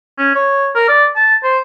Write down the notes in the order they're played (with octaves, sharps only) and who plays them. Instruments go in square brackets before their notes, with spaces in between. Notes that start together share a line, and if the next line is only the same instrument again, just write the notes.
[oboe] C#4
C#5
A#4
D5
A5
C5